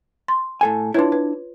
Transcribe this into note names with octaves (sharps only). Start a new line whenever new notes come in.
C6
A2 A4 G#5
D4 E4 F4 B4 C#5
B4